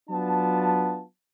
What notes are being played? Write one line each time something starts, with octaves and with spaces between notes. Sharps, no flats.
F#3 B3 D4 F4 A5